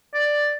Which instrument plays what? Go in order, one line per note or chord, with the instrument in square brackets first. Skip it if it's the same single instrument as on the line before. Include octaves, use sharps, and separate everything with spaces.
[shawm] D5